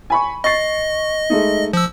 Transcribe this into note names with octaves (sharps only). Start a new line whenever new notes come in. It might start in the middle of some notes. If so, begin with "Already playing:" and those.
G#5 B5 C#6
D#5 C#6 A6 C7
G#3 A3 D#4
F3 E6